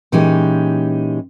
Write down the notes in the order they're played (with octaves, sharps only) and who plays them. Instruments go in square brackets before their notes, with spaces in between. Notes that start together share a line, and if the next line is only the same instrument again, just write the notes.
[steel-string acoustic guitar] A#2 E3 G#3 C#4 D#4 G4